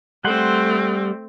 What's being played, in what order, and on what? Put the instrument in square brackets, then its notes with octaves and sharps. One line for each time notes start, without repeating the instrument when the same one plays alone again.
[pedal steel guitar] G3 F#5 C6 [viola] A3 C4